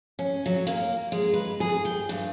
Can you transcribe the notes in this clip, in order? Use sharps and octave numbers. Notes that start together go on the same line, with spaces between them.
C#4
F#3
A#3
G#3
B4
G#4
G5
G2